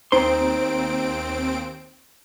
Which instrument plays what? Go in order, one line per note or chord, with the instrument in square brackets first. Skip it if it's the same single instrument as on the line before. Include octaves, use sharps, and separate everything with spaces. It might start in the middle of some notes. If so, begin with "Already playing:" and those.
[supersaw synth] D#2 C4 D7 [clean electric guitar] D#4 C6 [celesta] C5